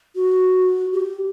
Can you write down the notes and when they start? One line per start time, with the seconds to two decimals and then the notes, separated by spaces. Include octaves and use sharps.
0.15 F#4
0.93 G4